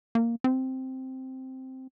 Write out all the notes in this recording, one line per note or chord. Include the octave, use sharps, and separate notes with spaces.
A#3
C4